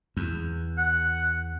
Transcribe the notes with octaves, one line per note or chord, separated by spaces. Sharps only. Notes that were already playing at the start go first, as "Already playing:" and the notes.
E2
F#5